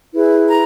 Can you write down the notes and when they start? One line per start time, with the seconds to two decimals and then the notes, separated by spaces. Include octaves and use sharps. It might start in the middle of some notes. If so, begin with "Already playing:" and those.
0.12 E4 G#4 B4
0.49 A#5